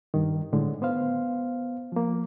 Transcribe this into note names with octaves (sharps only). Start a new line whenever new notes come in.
G2 D#3
A2 D3 G#3
B3 C5 F5
F3 A#3